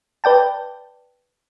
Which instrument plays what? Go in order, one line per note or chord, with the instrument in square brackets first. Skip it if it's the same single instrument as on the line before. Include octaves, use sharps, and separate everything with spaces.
[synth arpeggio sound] B4 D5 G5 A5